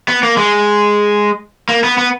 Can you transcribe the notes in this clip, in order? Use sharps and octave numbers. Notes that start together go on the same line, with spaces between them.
B3
A#3
G#3
A#3
B3
B3